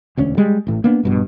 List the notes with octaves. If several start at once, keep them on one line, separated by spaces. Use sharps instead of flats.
E1 D2 C#4
G3 G#3
A1 A2
A#3 B3 D4
A#1 G2 B2